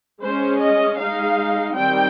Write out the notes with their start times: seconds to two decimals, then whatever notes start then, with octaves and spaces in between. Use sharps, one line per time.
0.22 G#3 C#4 C5
0.60 D#5
0.98 G#3 D#4 F5
1.75 D#3 G3 C4 G5